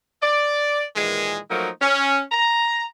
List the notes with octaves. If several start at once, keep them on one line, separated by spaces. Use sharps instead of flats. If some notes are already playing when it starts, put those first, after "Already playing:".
D5
A#2 D#3 E3 G#3
F3 F#3 A3 A#3 D#4
C#4
A#5